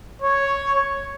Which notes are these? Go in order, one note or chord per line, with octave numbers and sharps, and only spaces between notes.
C#5